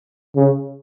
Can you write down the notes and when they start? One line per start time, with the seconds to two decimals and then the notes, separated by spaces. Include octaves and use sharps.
0.36 C#3